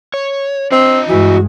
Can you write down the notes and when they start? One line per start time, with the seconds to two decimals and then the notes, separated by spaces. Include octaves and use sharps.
0.14 C#5
0.72 C4 D4 F4 D#5
1.09 G2 E3 G#3 F#4